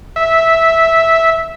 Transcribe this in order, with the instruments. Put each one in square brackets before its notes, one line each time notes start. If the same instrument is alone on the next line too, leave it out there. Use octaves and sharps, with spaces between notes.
[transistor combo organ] E5